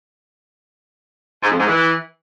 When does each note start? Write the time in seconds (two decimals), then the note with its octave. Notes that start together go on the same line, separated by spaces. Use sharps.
1.43 G#2
1.51 F2
1.59 G#2
1.67 E3